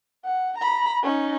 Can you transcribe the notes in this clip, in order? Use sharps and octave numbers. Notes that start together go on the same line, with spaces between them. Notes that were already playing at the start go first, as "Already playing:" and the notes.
F#5
A#5 B5
C#4 D#4